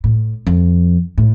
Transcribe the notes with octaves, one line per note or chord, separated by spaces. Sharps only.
A2
F2
A2